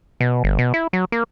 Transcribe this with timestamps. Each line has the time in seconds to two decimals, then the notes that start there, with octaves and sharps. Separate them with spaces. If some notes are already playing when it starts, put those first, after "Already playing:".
0.21 B2
0.44 G1
0.59 B2
0.74 E4
0.93 F#3
1.12 A#3